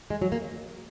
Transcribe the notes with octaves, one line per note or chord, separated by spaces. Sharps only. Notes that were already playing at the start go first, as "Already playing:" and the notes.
G#3
F#3
A#3